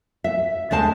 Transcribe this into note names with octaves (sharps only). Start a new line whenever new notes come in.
E5
D2 G#3 C5 A5